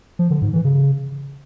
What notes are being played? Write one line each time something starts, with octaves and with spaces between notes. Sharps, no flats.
F3
D3
G#2
E3
C#3